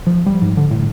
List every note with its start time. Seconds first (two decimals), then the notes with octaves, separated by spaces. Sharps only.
0.07 F3
0.26 G3
0.42 G#2
0.57 D3
0.71 A2